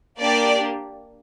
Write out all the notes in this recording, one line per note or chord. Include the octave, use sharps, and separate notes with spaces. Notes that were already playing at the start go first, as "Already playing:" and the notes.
A#3 D4 G4 D5